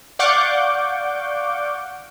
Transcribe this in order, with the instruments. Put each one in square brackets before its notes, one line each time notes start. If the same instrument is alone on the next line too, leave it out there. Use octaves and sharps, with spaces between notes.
[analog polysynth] D5 F5 F#5 C#6 D6 G6